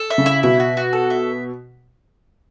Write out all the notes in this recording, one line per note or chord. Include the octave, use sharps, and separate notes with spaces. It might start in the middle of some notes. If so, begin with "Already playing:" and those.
Already playing: A4
E5
C#3
E4
B2 E5
F#4
F#4
A4
E5